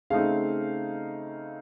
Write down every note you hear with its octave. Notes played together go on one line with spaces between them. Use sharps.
C#3 A3 C4 D#4 F5